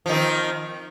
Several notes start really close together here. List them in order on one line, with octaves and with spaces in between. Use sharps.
F3 D#3 C4